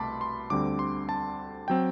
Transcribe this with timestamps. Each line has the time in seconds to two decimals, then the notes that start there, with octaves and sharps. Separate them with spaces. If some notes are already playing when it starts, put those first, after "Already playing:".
Already playing: C2 B2 A3 A5 B5 C6 D6
0.21 C6
0.50 D2 D3 G3 C4 D6
0.79 C6
1.09 A5
1.68 F#3 C4 G5